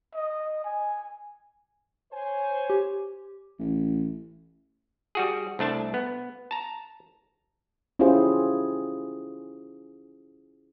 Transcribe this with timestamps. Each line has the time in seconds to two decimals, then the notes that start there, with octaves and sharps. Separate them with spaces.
0.15 D#5
0.64 G#5
2.12 C5 C#5 G#5
2.70 G4
3.59 A1
5.15 G3 F#4 G#4
5.59 C2 A3 D4 A5
5.94 B3
6.51 A5 A#5
7.99 C#4 E4 F4 G4 G#4 C5